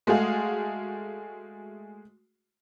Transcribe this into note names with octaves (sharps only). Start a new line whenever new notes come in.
G#3 A3 F#4 G#4 F5